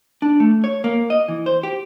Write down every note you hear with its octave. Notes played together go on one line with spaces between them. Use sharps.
D4
A3
C#5
A#3
D#5
E3
C5
G4